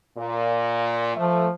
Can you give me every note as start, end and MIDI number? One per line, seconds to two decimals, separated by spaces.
0.18 1.16 46
1.16 1.51 53
1.16 1.45 57